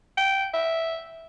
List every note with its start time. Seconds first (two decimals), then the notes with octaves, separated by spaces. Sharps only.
0.17 G5
0.54 E5